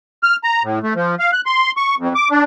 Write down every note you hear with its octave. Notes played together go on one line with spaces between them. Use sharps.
F6
A#5
A2
A3
F3
F5
F#6
C6
C#6
F2
D6
D4